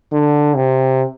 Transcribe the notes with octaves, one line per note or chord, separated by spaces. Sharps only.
D3
C3